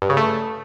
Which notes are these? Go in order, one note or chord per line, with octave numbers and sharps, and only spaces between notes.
G2
C#3
A3